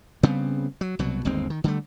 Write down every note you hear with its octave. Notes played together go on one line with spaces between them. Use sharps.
C#3 G3 B3 C4
F#3
C2 B2 F#3
G1 D#2 G#3 C4
D#3
D3 G3 A3